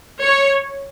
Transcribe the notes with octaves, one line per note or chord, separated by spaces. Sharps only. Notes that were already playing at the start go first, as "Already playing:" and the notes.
C#5